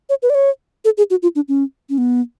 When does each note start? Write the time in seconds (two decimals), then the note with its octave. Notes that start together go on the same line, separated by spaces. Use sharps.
0.09 C#5
0.22 B4
0.30 D5
0.35 C#5
0.85 A4
0.98 G#4
1.10 F#4
1.23 F4
1.35 D4
1.48 C#4
1.90 C#4
1.98 B3